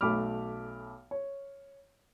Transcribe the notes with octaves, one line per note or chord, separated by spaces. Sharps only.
B1 A3 B5 D6 F6
C#5